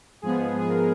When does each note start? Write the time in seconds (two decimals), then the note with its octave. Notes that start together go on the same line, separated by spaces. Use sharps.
0.22 G#2 F3 G#3 B3 G#4
0.59 G#4
0.69 A#4